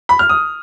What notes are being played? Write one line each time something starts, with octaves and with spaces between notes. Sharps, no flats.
B5
F6
D#6